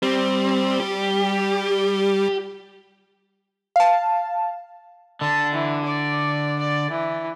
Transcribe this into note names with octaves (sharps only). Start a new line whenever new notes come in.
G3 C4
G4
F5 A5
D3 A5
E3
D5
D5
E3